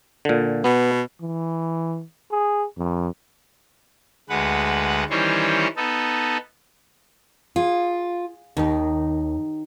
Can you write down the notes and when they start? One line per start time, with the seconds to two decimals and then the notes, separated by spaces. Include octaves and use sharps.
0.25 A#2 D3
0.64 B2 B3
1.22 E3
2.32 G#4
2.78 F2
4.29 D2 G#3 B4 F#5
5.10 D#3 E3 G3 C#4 C5 C#5
5.77 B3 D#4 A4
7.56 F4 G#4
8.57 D#2 D#3 D#4